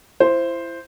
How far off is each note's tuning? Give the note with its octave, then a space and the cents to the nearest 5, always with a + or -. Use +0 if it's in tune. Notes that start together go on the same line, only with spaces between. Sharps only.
E4 +30 C5 +0